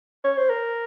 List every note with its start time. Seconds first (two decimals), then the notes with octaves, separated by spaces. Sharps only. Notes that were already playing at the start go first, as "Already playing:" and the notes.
0.24 C#5
0.37 C5
0.50 A#4